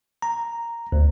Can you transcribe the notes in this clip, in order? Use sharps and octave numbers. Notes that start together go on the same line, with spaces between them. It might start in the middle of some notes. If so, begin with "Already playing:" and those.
A#5
D2